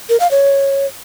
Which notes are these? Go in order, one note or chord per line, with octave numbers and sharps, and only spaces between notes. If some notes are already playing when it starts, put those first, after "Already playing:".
A#4
F5
C#5